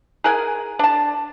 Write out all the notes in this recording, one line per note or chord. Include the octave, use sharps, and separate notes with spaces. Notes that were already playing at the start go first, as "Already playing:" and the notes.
G#4 A#4 F#5 G#5
D4 A5